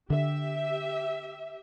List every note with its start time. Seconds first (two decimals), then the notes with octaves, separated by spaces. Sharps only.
0.10 D3 G4 E5